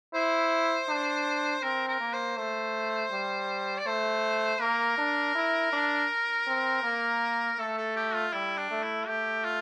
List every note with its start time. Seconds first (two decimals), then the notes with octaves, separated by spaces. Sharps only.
0.14 E4 C5
0.89 D4
1.63 C4 A#4
1.88 A#4
2.00 A#3
2.13 C5
2.37 A3 C5
3.12 G3
3.78 D5
3.86 A3 C5
4.60 A#3 A#4
4.98 D4
5.35 E4
5.73 D4
6.47 C4
6.84 A#3
7.59 A3 A4
7.77 A4
7.96 G4
8.14 F4
8.33 G3 E4
8.57 D4
8.71 A3
8.82 E4
9.07 A3 G4
9.44 F4